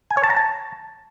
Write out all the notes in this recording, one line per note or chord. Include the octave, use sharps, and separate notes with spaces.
G#5
C#5
A5
A#5
A5